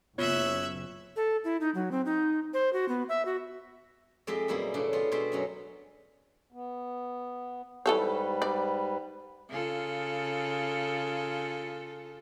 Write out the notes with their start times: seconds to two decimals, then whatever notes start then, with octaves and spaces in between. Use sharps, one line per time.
0.18 F#1 B3 F4 C#5 E5 F#6
1.16 A4
1.44 E4
1.61 D#4
1.75 F#3
1.91 C4
2.05 D#4
2.54 C5
2.73 F#4
2.89 B3
3.09 E5
3.25 F#4
4.27 F2 G#3 G4 E5 G5 G#5
4.48 F#2 B2 G3 G#3 A#3 E4
4.74 A2 C#3 D4
4.93 G#3 B3 F4
5.12 B2 G#3 C5 E5 G5
5.32 F#2 F#3 C#4
6.52 B3
7.86 G#2 E3 G3 A4 B4 C#5
8.42 D5
9.49 C#3 F4 A4